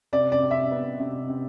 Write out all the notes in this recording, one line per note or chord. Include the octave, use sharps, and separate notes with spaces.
C3 D5
D5
C3
E5
B3
C3
C3